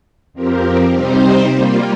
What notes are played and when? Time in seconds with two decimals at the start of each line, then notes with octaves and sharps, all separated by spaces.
0.33 F2 F3 C4 G4 A#4
0.93 C3 G3 C4 D#4 C5
1.51 G3 A#3 F4